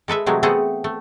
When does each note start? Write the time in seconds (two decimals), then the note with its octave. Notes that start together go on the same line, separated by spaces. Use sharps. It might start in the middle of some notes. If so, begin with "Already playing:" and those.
0.08 G#3 A4 B4 E5
0.26 C3 E3 F#3 G#3 A3
0.43 A3 B3 C4 G#4 A4 F#5
0.84 A3